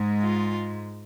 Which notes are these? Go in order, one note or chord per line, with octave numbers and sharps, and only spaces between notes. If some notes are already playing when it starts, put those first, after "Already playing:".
Already playing: G#2 G#3
F4